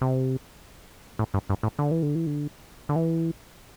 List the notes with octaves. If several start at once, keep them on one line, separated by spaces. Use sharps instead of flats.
C3
A2
G2
G2
A2
D3
E3
D3
E3
D3
D3
E3